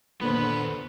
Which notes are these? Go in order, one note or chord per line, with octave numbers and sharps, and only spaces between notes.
D#2 A#2 D3 B3 B4 C5